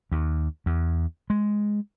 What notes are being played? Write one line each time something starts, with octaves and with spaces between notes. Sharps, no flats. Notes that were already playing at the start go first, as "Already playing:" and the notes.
D#2
E2
G#3